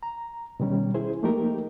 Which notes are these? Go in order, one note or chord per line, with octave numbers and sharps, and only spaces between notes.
A#5
B2 D#3 G3 C#4
E4 G#4 C5
F3 A3 A#3 D#4 G4 A#4